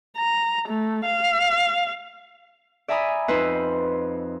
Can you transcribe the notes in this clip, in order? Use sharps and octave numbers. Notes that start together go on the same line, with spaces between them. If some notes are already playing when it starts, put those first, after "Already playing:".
A#5
A3
F5
D5 E5 G#5 A#5 B5 D#6
F2 D#4 B4 C5 D#5 E6